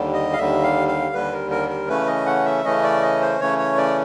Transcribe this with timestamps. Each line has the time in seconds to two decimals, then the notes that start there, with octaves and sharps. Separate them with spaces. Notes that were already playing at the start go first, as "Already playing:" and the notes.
Already playing: D#2 D3 G3
0.13 D#5
0.33 F5
0.37 D#2 D3 G3 E5
0.63 F5
0.88 F5
1.13 D#2 D3 G3 B4
1.33 A#4
1.51 A#4
1.69 A#4
1.88 C#3 E3 A3 C#4 B4
2.07 D#5
2.26 F#5
2.46 E5
2.64 C#3 E3 A3 C#4 D#5
2.83 D5
3.02 D#5
3.21 C5
3.39 C#3 E3 A3 C#4 C#5
3.58 C#5
3.77 D5